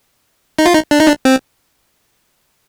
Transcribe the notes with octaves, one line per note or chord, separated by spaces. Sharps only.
D#4
F4
D#4
D4
D#4
D4
C4